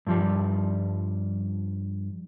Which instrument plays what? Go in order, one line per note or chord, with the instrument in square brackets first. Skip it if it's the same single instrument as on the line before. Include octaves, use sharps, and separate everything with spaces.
[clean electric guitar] G2 F3 G3